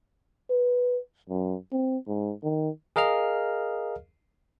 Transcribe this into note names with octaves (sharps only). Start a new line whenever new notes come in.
B4
F#2
C4
G#2
D#3
G#4 A#4 D#5 F5 F6